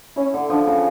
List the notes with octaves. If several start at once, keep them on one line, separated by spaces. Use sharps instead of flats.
C#4 E4
D3
F3 D4
C#3